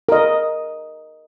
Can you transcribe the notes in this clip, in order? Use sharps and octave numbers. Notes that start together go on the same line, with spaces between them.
A#4 D#5